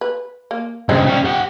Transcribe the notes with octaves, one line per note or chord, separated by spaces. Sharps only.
B4
A#3
G2 C#3 F#3 G#3 C4
G3 C#4
G4 F#5